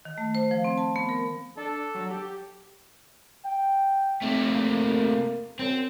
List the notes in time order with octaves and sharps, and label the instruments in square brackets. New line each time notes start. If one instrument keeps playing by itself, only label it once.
[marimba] D#3
A3
C5
F3
C4
A5
B3
A#4
[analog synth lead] D4 [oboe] A4
[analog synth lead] F#3
G4
[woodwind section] G5
[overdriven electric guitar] C3 A3
[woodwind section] A#3
[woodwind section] F#2 [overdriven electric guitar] C4